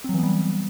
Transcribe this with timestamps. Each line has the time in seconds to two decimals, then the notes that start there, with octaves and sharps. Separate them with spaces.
0.04 C4
0.09 F#3
0.14 E3
0.18 B3
0.23 G3